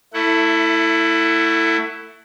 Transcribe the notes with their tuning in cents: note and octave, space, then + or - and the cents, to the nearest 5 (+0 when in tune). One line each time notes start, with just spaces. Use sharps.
A3 +25 E4 +0 F#5 +15